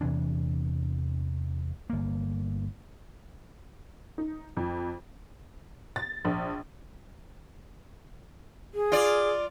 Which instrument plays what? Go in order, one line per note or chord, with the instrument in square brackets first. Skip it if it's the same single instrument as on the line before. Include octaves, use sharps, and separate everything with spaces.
[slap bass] E2 C3 E3 D4
G1 A#3
[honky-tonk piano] D#4
F2
A6
A#1
[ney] G#4
[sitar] F4 D5